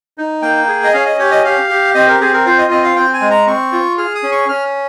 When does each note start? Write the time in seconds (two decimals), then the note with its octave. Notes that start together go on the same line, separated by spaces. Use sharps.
0.18 D#4
0.42 A#3 G5
0.68 G#4
0.84 D#5
0.93 C#4 F5
1.06 D#5
1.19 G4 C#5
1.31 D#5
1.44 G4 F5
1.69 G4
1.94 C4 D#5
2.08 A#4
2.20 C4 G#4
2.33 A#4
2.46 F4 C5
2.58 D#5
2.71 C4 D#5
2.84 F5
2.96 C4 G5
3.13 G#5
3.21 G#3
3.30 A#5
3.47 C4 C#6
3.72 F4
3.98 G#4 F6
4.15 D#6
4.23 C#4
4.32 C#6
4.49 C#4 F6